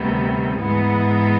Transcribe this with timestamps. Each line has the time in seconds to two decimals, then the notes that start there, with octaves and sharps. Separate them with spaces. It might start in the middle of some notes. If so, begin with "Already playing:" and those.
Already playing: D2 C3 D#3 G3 B3
0.60 G#2 E3 G#3 B3